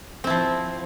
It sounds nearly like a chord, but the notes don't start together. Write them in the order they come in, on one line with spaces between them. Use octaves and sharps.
C4 E4 F3